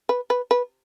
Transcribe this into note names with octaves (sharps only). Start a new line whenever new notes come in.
B4
B4
B4